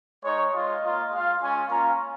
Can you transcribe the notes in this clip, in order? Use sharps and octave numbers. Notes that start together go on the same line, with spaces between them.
G#3 D#4 C#5
G#3 F4 D#5
A#3 F4
G#3 F4 F5
G#3 C#4 F4 G#5
A#3 C#4 F4 A#5